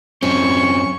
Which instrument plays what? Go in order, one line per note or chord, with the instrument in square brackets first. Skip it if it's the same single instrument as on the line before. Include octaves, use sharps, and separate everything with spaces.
[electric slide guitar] F#2 C4 [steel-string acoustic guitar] C#4 [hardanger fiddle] C#6